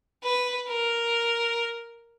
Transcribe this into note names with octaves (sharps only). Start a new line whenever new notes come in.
B4
A#4